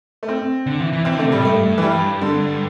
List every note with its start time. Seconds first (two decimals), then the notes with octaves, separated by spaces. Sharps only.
0.23 A3
0.28 C4
0.66 D3
0.80 E3
0.93 E3
1.05 E3 C4
1.15 D3 A3
1.24 C3
1.32 A2 G3
1.44 G2 A3
1.63 G2
1.78 E3
1.82 G3
2.21 D3